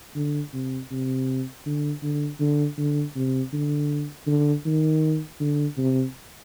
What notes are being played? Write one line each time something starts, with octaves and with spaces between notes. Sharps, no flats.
D3
C3
C3
D3
D3
D3
D3
C3
D3
D3
D#3
D3
C3